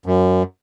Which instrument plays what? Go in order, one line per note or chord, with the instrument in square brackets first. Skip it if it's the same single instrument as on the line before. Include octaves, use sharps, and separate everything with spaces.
[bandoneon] F#2